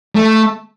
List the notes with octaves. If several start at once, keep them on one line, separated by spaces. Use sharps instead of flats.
A3